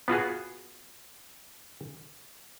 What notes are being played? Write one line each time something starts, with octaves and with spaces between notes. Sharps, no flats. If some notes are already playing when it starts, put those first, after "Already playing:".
B3 F4 F#4 G#4